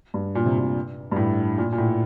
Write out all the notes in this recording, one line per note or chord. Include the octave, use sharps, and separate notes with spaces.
G2
A#2
C3
A#2
G2
A2
A#2
A#2
A2